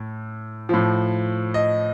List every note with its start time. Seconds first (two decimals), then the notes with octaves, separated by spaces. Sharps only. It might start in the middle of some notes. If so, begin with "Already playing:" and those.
Already playing: A2
0.69 A2 F3
1.54 D#5